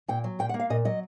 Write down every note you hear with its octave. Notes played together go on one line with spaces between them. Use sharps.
A#2 G5
F#3
A#2 G5
F#5
A#3
F5
A#2 D#5
F#3 D#5